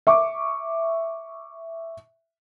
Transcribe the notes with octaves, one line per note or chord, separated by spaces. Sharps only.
E5 C#6 D6